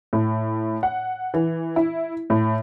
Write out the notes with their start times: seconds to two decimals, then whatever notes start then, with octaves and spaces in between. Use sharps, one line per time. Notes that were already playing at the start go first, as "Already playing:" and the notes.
0.13 A2
0.83 F#5
1.34 E3
1.76 E4
2.30 A2